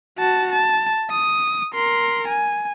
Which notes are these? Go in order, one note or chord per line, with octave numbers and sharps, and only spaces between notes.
F#4 A5
A5
D#6
A#4 C6
G#5